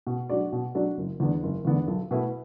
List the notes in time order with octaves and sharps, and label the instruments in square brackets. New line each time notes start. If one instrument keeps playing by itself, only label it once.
[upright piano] B2
F#3 D4 F#4 D5
B2
F#3 D4 F#4 D5
F#1
E2 D3 B3 D4
F#1
E2 D3 B3 D4
B1
B2 A3 E4 B4